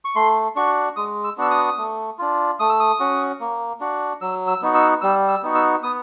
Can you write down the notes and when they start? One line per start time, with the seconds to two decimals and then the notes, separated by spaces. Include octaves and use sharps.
0.05 C#6
0.16 A3 C6
0.56 D4 F#4 C#6
0.96 G#3 D#6
1.24 E6
1.37 B3 D4 F#4 E6
1.51 D#6
1.78 A3
2.19 D4 F4
2.60 A3 D#6
2.69 E6
2.80 D#6
3.00 C#4 F#4
3.40 A#3
3.81 D4 F#4
4.21 F#3 E6
4.48 E6
4.62 B3 D#4 F#4
4.75 E6
5.01 G3 E6
5.28 E6
5.43 B3 D#4 F#4
5.55 E6
5.83 B3 D#6